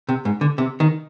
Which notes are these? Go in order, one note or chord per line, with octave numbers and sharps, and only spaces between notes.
C3
G#2
D3
C3
D#3